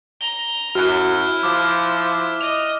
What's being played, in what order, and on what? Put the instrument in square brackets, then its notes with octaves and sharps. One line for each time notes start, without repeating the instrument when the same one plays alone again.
[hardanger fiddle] A#5 [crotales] G7
[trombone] F#2 [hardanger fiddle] E4 E5 [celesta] F#4 [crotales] F6 F#6
[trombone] F3 [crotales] D6 [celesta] F6
[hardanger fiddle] D#5 [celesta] F7